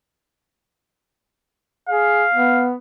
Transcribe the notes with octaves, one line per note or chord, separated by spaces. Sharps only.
G#4 F5
B3